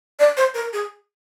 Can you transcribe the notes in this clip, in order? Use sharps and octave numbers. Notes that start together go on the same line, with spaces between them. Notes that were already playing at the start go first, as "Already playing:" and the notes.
D5
C5
A#4
G#4